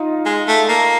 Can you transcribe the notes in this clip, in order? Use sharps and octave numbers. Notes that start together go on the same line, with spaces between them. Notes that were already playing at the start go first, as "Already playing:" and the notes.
Already playing: D#4 F4
G#3
A3
A#3